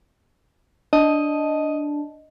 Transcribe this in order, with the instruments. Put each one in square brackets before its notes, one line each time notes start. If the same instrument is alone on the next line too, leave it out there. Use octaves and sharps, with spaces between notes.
[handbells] D4 [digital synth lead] D#5